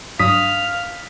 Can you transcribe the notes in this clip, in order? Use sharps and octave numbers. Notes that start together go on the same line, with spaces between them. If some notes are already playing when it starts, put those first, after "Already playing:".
G2 F#3 D4 F5 D#6 B6